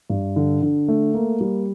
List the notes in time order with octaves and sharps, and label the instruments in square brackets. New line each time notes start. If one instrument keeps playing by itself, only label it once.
[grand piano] G2
D3
D3
A3
A#3
G3